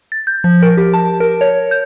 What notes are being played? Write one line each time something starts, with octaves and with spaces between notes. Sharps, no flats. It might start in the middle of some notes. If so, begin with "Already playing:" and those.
A6
G6
F3
A#4
G4
A5
A#4
C#5
G6